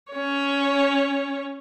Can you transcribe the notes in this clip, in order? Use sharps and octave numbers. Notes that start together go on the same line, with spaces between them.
C#4 C#5